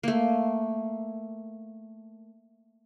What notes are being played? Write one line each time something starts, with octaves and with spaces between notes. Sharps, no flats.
A3 A#3